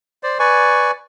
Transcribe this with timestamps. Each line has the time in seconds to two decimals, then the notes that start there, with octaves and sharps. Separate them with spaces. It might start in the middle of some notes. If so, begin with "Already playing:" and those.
0.23 C5 D5
0.39 B4 D5 G#5 C#6